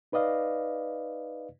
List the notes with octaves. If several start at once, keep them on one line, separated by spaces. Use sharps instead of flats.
D#4 B4 D5 D#5 F5